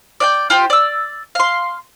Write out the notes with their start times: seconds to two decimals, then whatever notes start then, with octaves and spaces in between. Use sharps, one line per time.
0.20 D5 F#5 G5
0.50 F4 G4 C5 G5
0.70 D5 E6
1.35 F5 C6